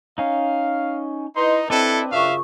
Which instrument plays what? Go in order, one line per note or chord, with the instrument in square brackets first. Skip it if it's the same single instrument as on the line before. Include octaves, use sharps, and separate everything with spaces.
[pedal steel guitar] C#4 D#4 [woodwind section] F5
[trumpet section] D#4 [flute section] E4 B4 D#5 [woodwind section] C6
[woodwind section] C4 [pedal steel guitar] D4 B4 [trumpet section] E4 A4 [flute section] D#5 A5
[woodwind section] F#2 C#3 [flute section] F4 C#6 [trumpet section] E5 F5